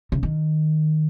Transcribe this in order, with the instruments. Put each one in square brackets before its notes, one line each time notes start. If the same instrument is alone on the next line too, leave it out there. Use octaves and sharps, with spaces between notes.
[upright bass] C#3
D#3